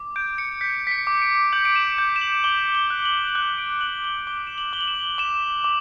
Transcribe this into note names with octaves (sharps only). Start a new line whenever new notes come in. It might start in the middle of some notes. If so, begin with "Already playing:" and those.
Already playing: D6
G6 D7
C#7
G6 B6
B6
C#7
D6
D7
G6 F#7
D7
E7
G6 E7
E7
F#7
D6 G7
G7
F#6
F#7
E7
F#6 F#7
D7
F#6 F#7
G7
D6 G7
E7
F#7
D6 G7
F#7
E7
D6 E7
D6